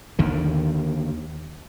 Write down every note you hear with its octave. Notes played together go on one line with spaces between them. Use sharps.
D#2 D3 D#3